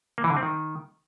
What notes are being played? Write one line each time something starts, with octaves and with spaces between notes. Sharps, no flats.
A#3
E3
D3
C4
D#3